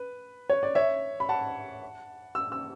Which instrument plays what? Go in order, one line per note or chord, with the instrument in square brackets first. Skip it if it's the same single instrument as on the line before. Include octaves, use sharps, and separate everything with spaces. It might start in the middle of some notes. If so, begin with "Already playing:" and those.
Already playing: [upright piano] B4
C#5
D5
C#5 E5
B5
F#5 A5
E6
E6